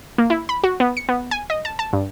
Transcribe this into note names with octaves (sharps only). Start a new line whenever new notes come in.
A#3
E4
B5
F#4
B3
C#7
B3
G#5
D#5
A5
A5
G2